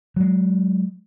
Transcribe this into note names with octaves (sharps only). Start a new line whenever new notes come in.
F#3 G#3